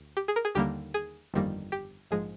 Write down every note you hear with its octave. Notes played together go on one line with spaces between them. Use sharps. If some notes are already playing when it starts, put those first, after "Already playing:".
Already playing: D2
G4
G#4
A#4
G#4
D#2 D3 G3 A#3 G4
G#4
G1 F2 D#3 G3 A#3
G4
A#1 G#2 F3 G#3 G#4